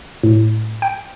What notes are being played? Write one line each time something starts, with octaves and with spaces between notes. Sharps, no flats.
A2
G5